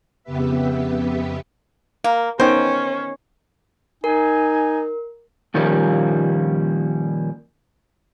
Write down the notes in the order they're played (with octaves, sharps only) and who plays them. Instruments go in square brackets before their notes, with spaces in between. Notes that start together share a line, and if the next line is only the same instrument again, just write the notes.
[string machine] F2 C#3 B3 G4 B4 E5
[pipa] A#3 [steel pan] A#4
[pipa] D#3 [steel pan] B3 D#4 G5 [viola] C#4 [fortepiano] C5
[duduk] D#4 [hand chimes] A#4 [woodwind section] G#5
[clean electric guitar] A#2 D#3 F3 G3 A#3 C#4